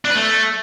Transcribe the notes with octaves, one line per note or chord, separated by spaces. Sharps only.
D4
B4
A3